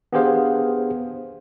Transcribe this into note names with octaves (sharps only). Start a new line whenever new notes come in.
B3 D4 G4 G#4 C5 F5